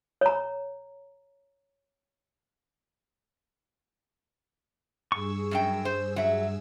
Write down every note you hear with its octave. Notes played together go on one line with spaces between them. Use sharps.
C#5 A#5
G2 G#4 C#6 E6
F#2 F#3 G5
C5
F#3 E5